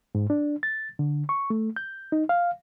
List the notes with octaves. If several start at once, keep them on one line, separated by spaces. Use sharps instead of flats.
G#2
D4
A6
D3
C#6
A3
G6
D#4
F5